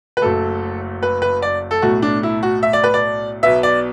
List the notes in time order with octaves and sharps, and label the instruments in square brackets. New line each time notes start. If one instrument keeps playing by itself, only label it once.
[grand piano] B4
F#1 F#2 F#3 A3 A4
B4
B4
D5
A4
B1 A2 A3 F#4
D4
E4
F#4
E5
D5
B4
D5
B1 B2 B3 E5
D5